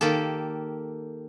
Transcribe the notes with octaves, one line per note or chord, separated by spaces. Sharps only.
D#3 A#3 G4 A4